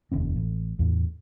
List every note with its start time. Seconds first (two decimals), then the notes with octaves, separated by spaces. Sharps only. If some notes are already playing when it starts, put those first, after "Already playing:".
0.12 F1 D#2 C#4
0.36 A1
0.79 E2 A2